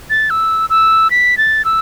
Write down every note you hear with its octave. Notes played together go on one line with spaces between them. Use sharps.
A6
E6
E6
B6
A6
E6